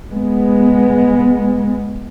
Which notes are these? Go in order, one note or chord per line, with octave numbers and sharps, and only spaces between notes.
G#3 B3